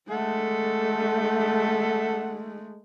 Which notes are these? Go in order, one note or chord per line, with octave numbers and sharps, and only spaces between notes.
G#3 A3 A4 E5 F#5